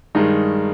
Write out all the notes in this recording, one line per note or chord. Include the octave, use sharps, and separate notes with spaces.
G2 D#3 G#3 D#4